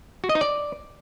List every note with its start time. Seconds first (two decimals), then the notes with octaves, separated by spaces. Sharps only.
0.24 F#4
0.29 D#5
0.35 D#4
0.41 D5